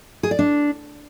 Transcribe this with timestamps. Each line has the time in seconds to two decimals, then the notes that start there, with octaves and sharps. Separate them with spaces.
0.23 G#4
0.31 D5
0.39 D4